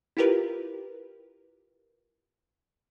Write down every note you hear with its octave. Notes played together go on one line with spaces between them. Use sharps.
E4 F4 G4 A#4 B4